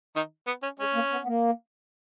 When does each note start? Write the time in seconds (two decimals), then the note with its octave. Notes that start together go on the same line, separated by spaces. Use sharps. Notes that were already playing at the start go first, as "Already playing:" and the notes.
0.16 D#3 D#4
0.47 B3
0.63 C#4
0.79 G#3 C#4
0.95 A#3
1.11 B3
1.23 B3
1.27 A#3